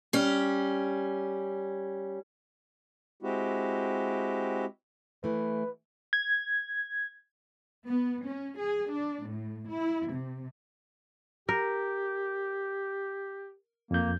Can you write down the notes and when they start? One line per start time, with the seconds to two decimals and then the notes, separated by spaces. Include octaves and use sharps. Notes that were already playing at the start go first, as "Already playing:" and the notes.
0.13 G3 C#4
3.23 G#3 C4 E4 F#4 G4
5.24 E3 A3 B4
6.13 G#6
7.86 B3
8.26 C#4
8.58 G#4
8.89 D4
9.25 A2
9.68 E4
10.10 C3
11.49 G4 A#4
13.91 F2 A#3 G6